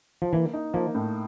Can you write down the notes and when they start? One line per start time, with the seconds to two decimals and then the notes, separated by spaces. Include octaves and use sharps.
0.22 F3
0.33 E3 A#3
0.53 D#4
0.74 F3 A#3
0.95 A2